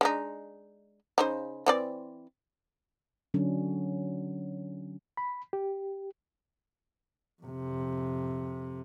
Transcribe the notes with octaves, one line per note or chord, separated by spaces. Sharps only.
G#3 D4 D#4
C#3 D#4 C5
E3 C4 D5
D3 F#3 C#4 D4
B5
G4
F2 C3